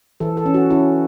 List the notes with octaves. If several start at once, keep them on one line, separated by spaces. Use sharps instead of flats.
E3 A4
A4
C#4
F#4
C#4 E4